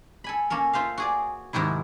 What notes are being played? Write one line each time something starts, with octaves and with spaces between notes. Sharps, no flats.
A4 G#5 B5
A#3 C#4 A4 A#4
F4 C5 E5 F5
F#4 G#4 D5
G#2 C3 D#3 F#3 E4